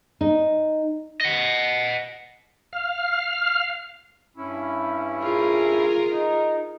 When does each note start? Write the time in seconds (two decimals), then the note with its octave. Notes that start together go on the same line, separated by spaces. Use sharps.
0.21 D#4
1.21 D#5 F#5
2.73 F5 F6
4.37 G2 C#4 E4
5.23 F4 G#4 A#4
6.11 D#4